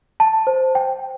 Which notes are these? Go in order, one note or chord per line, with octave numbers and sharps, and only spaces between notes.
A5
C5
G5